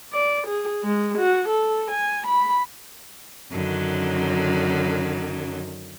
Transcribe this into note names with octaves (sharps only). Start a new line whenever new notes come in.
D5
G#4
G#3
F#4
A4
G#5
B5
F#2 D3 D#3 F#3 C#4